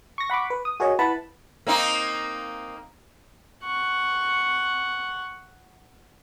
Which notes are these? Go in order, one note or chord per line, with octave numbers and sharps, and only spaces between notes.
C#6 A#6
F#5 B5 C#6 D6
B4
D#6
F#4 G#4 A#4 C#5 D#5
E4 B4 F#5 A5 B5
A#3 C4 D#4
F#5 C#6